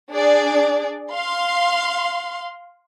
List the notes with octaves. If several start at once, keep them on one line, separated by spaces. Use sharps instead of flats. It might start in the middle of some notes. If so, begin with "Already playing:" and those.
D4 G#4 D5
F5 C6